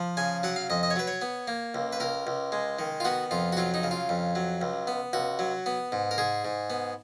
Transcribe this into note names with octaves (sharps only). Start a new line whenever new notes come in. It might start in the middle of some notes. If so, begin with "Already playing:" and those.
Already playing: F3
C#3 G#5
F#3 F#5
F5
F2 D#5
D#5
C#5
F#3 B4
C#5
B3
A#3
C#2
B4
C#2 A#4
C#2
G#3
D#3
F4
B3 F#4
F2 F4
F#4
F#3 F4
D#4
C#3
F4
F2
F#3
C#2
B3
C#2 F#4
F#3
B3
G#2
A#4
G#2 G#4
G#2
B3